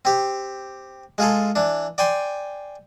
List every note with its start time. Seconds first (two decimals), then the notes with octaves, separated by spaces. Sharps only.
0.05 C4 G4
1.18 G#3 F4 G#4 A4
1.56 E3 D4
1.98 D5 G5 G#5 C6